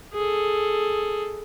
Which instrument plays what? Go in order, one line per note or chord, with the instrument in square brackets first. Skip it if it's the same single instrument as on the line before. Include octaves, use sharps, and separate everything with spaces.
[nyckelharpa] G#4 A4